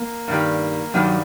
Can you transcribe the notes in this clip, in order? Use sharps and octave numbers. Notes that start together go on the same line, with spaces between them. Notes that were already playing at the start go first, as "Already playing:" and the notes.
Already playing: A#3
G2 D#3 G3
G2 D#3 F#3 G3